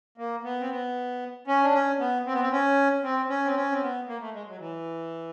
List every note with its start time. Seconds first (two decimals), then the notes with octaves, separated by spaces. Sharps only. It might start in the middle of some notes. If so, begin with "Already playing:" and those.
0.18 A#3
0.44 B3
0.60 C4
0.70 B3
1.47 C#4
1.64 D4
1.74 C#4
2.00 B3
2.26 C4
2.33 B3
2.41 C4
2.52 C#4
3.03 C4
3.30 C#4
3.45 C4
3.56 C#4
3.72 C4
3.82 B3
4.08 A#3
4.21 A3
4.34 G#3
4.48 F#3
4.59 E3